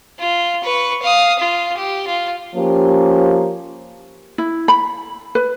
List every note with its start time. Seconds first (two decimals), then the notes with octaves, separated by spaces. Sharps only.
0.19 F4
0.64 B4 C#6
1.02 F5 D#6
1.39 F4
1.77 G4
2.07 F4
2.56 F3 A#3 C#4 G4
4.38 E4
4.68 B5
5.35 B4